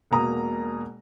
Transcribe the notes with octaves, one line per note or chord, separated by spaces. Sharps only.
E1 B2 A#3 A#5 D#6